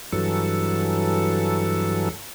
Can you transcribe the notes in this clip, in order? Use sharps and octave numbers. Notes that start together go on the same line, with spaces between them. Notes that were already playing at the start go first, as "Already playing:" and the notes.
G2 E3 F#3 A4